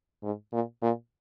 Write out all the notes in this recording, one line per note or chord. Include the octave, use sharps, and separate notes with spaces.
G#2
A#2
A#2